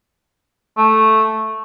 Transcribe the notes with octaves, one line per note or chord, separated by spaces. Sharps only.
A3